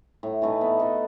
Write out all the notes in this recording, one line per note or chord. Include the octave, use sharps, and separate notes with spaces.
A2
E3 A3 D#4
B3
D#4 A4